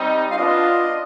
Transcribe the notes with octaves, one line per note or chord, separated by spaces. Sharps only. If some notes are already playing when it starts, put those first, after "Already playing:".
Already playing: G3 C4 D#4
F5
B3 D4 F4 D#5